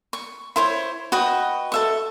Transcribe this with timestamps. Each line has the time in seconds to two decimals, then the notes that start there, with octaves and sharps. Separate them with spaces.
0.13 C#6
0.56 E4 C5 C#5
1.12 F#4 B4 D#5 G5
1.72 A4 E5 C#6